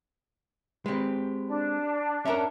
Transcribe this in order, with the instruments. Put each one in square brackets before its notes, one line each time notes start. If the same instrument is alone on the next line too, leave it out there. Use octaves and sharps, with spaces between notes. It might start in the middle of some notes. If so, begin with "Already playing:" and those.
[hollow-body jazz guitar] G#3 C4 [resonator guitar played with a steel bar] G4 B4
[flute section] D4
[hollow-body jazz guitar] C#4 A#4 [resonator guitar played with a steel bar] E5 A5 A#5